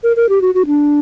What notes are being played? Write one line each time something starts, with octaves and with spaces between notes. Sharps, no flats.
A#4
A#4
G4
F#4
F#4
D4